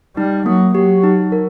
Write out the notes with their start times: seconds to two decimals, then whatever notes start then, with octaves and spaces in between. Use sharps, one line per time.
0.17 G3 D#4
0.46 F#3 A#3
0.75 F#3 G4
1.04 D#4
1.32 A#4